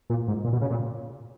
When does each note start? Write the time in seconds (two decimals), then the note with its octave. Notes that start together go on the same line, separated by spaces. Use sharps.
0.10 A#2
0.28 G#2
0.44 A#2
0.53 B2
0.61 C#3
0.70 A#2